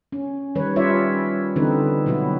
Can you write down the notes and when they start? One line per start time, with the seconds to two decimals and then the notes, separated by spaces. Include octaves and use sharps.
0.12 C#4
0.55 D#3 G3 B4 C#5
0.76 G3 C#4 F4 C#5 D5 E5
1.56 D3 E3 C4 D#4 A4 B4
2.06 B2 F#3 B3 E4 F#4